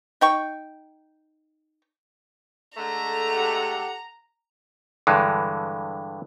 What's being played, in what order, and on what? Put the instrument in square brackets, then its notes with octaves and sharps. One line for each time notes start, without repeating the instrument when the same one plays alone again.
[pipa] D#4 G5 C#6
[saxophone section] D3 G#3 A3 [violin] A#5
[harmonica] G4 A4 F#5
[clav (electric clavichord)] G2 D3 E3 G#3